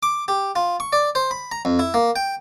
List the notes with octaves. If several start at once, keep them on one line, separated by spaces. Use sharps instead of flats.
D6
G4
F4
C#6
D5
C5
B5
A#5
F2
E4
A#3
G5